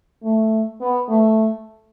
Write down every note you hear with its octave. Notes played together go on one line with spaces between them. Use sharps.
A3
B3
A3